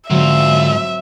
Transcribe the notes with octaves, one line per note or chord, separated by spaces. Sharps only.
G#2 D3 F#3 C4 F4 E5